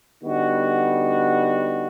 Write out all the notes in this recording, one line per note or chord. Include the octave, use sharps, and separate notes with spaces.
D3 G3 B3 D#4 F#4